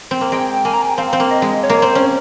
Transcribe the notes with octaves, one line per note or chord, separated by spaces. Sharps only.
C4
A#3
G#3 G5
A#3 G#5
A#5
G#5
G5
C4 F5
C4
A#3
D#5
G#3
C#5
A#3
C4 C5
C#4